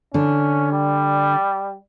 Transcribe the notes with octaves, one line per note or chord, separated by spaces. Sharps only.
D3 C#4 D4
G3